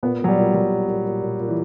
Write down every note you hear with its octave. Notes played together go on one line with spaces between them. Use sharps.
A#2 B3
A#2 F#3
G3
A#2
A#2 F#3
A#2
A#2
A#2
A#2
A#2
E3